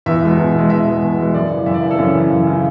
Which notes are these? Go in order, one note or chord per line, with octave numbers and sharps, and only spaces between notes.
E2 E5
B2 G#3
E2
B2 G#3
E2 E5
B2 G#3
E2
B2 G#3
F#2 D5
C#3 E3
F#2 E5
D5
C#3 E3 E4
A4
F#2 C#4
C#3 E3
F#2
C#3 E3